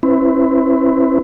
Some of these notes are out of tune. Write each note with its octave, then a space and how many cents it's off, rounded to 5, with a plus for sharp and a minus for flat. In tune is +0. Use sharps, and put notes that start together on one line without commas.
C4 +45 E4 -5 B4 +25